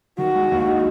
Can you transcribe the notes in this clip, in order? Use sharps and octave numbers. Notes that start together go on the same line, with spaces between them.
D#3 F#4
G#3
D#2
D#4